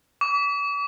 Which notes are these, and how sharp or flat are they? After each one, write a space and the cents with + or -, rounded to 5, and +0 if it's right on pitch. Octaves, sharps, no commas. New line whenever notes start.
D6 -45